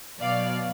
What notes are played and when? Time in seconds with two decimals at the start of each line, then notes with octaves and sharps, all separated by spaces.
0.20 B2 F#3 D5 F5